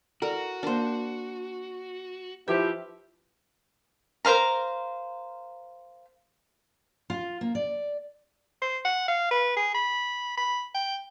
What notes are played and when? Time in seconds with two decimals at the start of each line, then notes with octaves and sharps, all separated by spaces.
0.22 E4 F#4 A4 A#4 D5
0.63 A#3 D4 A#4 C5
2.48 F3 E4 G4 B4 C5 E5
4.25 A#4 C5 F5 A#5
7.10 F4
7.41 A#3
7.55 D5
8.62 C5
8.85 F#5
9.08 F5
9.31 B4
9.57 G#4
9.74 B5
10.38 B5
10.74 G5